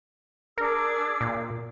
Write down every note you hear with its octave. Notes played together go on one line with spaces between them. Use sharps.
D4 G#4 A#4 E6
A#2